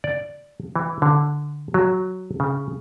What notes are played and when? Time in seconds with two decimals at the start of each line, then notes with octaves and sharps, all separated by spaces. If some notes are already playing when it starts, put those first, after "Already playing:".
0.04 D5
0.76 E3
1.02 D3
1.74 F#3
2.40 C#3